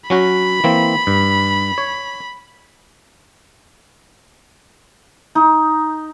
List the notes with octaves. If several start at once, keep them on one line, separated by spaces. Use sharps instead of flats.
F#3 C#4 F#4 B5
E3 A#3 C4
G2
C#5
D#4